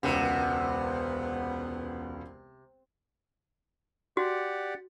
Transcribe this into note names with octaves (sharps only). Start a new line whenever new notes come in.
E1 C#2 C3 B3 F#5
F#4 G4 D5 F#5